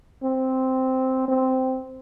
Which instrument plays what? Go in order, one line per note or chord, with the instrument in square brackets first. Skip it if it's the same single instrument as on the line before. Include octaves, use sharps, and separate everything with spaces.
[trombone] C4
C4